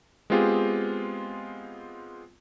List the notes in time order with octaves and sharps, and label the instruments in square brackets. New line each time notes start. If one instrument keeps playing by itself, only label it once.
[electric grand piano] G#3 B3 C4 F4 G4 G#4